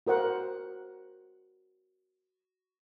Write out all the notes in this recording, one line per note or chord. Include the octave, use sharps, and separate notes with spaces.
F#4 A#4 C5 F#5 C#6